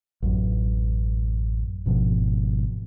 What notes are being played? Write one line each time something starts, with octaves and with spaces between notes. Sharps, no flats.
A1 F#2
G#1 G#2 B2 F3